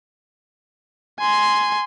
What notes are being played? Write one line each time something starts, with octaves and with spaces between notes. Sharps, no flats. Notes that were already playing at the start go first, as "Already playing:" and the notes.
G#5 C6